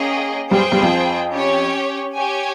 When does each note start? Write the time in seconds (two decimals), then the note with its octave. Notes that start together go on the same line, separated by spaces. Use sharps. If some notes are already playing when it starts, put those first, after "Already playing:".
Already playing: A#3 C#4 G#4 D#5 G5
0.51 G2 G3 G#4 C5 G5
0.72 G2 G3
0.82 F2 F3
1.33 C#4 G4 C#5
2.13 G4 C#5 G#5